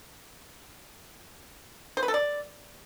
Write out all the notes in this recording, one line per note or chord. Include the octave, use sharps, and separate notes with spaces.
C5
B4
A4
D5